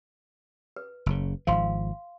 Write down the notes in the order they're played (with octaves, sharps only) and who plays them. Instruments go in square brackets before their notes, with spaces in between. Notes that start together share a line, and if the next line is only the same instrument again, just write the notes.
[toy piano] B4
[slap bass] F#1 C#3
[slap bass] G#1 F3 [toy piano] F5 C6